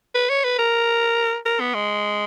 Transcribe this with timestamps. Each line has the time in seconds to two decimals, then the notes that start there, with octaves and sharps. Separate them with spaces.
0.15 B4
0.29 C#5
0.44 B4
0.59 A#4
1.45 A#4
1.60 B3
1.74 G#3